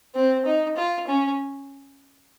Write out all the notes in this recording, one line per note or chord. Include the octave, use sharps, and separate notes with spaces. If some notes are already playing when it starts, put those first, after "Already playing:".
C4
D#4
F4
C#4